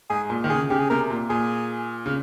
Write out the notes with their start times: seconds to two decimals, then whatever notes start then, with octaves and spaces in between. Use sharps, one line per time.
0.10 G#2 G#4
0.30 A#2
0.44 D#3
0.50 C#3 G#4
0.70 C#3 G4
0.80 G#4
0.89 C3 A#4
1.10 A#2
1.30 A#2 G#4
2.06 C#3